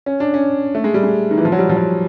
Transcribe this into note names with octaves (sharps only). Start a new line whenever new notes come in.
C#4
D4
C#4
A3
G#3
G3
G#3
D#3
E3
F3
F#3
G3
F3
F#3